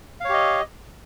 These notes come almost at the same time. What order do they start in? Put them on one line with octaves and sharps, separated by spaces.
F5 C#5 G4 D#5